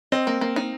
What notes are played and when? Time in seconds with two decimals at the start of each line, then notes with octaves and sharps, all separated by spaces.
0.12 C4 D#5
0.27 A#3
0.41 A#3
0.56 D#4